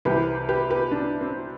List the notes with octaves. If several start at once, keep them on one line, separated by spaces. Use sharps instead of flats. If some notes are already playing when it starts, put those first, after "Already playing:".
C2 C3 E3 G4 B4
G4 B4
G4 B4
B3 D4
C4